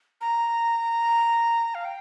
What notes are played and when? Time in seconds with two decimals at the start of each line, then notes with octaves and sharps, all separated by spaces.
0.21 A#5
1.75 F5
1.85 G5